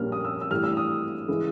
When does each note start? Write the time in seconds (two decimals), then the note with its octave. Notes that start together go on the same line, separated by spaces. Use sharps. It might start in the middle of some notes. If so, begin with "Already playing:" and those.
Already playing: A#1 A#2 G3 A#3 C#4 F6
0.12 D#6
0.25 E6
0.41 E6
0.51 A2 E3 G3 F6
0.64 E6
0.77 D#6
1.28 C#3 E3 G#3